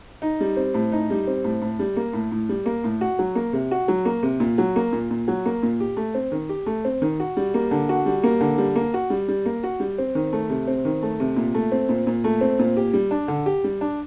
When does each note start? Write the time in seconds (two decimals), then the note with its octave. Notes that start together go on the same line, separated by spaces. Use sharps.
0.22 D#4
0.40 G3
0.57 C4
0.74 A2
0.92 D#4
1.10 G3
1.27 C4
1.44 A2
1.62 A2
1.79 G3
1.96 A#3
2.13 A2
2.32 A2
2.49 G3
2.66 A#3
2.84 A2
3.01 F#4
3.19 F#3
3.35 A#3
3.53 C3
3.71 F#4
3.88 F#3
4.05 A#3
4.23 C3
4.40 A#2
4.58 F#3
4.76 A#3
4.93 A#2
5.11 A#2
5.28 F#3
5.46 A#3
5.63 A#2
5.80 G4
5.97 A3
6.15 C4
6.32 D#3
6.49 G4
6.66 A3
6.85 C4
7.02 D#3
7.20 F#4
7.37 G3
7.54 A#3
7.71 D3
7.89 F#4
8.06 G3
8.23 A#3
8.41 D3
8.58 G3
8.76 A#3
8.94 F#4
9.10 G3
9.28 G3
9.46 A#3
9.64 F#4
9.80 G3
9.98 C4
10.15 D#3
10.33 A3
10.50 C3
10.67 C4
10.85 D#3
11.03 A3
11.20 C3
11.37 A#2
11.54 A3
11.72 C4
11.89 A#2
12.07 A#2
12.24 A3
12.41 C4
12.59 A#2
12.77 G4
12.93 G3
13.11 D4
13.28 D3
13.46 G4
13.64 G3
13.81 D4